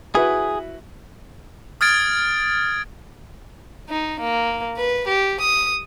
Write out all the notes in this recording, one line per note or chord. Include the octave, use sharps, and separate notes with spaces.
E4 F#4 G#4 B4
D#6 F6 G#6 A6 D7
D#4
A#3
B4
G4
D#6